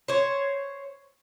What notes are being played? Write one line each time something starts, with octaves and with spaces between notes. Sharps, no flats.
C5 C#5